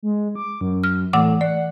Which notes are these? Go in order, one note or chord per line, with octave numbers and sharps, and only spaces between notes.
G#3
D6
F#2
F6
A2 E3 F#5 D6
D5 F#5